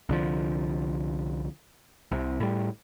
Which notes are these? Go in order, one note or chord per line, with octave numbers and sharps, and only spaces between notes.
C2 D3 F3
C2 C3
A2 G3